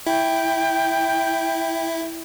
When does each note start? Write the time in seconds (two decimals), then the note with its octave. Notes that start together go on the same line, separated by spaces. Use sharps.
0.07 E4 G5